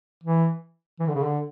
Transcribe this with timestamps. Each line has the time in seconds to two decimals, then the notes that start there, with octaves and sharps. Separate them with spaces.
0.23 E3
0.99 E3
1.07 D3
1.15 C#3
1.23 D3